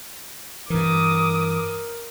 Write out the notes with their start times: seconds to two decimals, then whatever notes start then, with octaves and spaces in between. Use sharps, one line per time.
0.70 G2 E3 A#4 D6 D#6